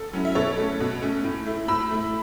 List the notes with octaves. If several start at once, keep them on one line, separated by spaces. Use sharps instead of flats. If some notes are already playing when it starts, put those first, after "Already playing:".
Already playing: A4
F#3 C#4 E4
E5
B2 A4 C#5
A3 C#4
B2
A3 C#4
A2
A3 E4
A2 B5 E6
A3 E4